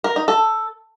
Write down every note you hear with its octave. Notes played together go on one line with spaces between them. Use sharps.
A#4
D#4
A4